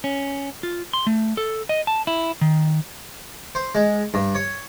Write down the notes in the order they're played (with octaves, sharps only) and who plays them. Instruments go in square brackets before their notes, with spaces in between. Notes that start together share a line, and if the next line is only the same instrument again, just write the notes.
[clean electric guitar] C#4
F4
C6
A3
A4
D#5
A5
E4
D#3
[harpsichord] C5
G#3
G2
C#5